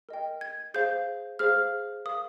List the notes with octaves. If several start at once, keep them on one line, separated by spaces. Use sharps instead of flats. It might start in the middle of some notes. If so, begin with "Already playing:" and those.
A#4 D#5 G5
G#6
G#4 C5 F5 G6
G#4 C5 F5 F6
A#4 F5 D#6